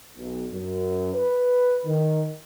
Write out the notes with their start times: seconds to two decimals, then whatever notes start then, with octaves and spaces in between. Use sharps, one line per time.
0.17 B1
0.52 F#2
1.14 B4
1.85 D#3